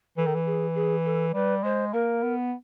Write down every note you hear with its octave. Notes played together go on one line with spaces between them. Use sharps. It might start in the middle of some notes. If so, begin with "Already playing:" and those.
E3 A4
D#3
E3
G#4
G#4
A4
G3 B4
G#3 C5
A#3 A#4
B3